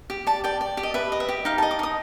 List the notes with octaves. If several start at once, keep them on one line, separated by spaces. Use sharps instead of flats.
G4
D5 A5
D5 G5
D5
G4
D#5
B4 E5
D#5
E5
G4
D#4 F5
A5
D#5
D6
D#4 D#6